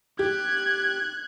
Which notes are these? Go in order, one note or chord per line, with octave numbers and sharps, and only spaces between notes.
G4 F#6 G#6